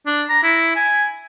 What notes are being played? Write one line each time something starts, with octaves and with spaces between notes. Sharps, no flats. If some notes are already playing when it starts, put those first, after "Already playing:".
D4
A#5
E4
G#5